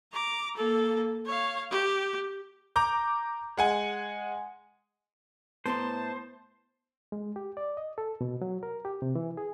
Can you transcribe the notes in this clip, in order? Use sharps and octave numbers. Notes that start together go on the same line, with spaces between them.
A#5 D6
A#3 A4
C#5 F5
G4
A#5 D6 G6
G#3 F#5 G#5
A2 B3 C5 A5 C6
G#3
G4
D5
D#5
A4
B2
F#3
A#4
G4
C3
E3
G#4